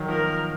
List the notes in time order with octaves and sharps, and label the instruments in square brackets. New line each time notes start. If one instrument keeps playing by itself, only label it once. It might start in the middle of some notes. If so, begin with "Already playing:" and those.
Already playing: [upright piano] D#3 F#3
[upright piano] F3 [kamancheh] A#4